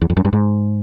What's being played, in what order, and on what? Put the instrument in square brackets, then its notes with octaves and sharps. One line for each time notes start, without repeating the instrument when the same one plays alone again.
[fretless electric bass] E2
F2
F#2
G2
G#2